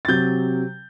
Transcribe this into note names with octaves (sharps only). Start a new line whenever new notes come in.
A6
C3 F#3 G6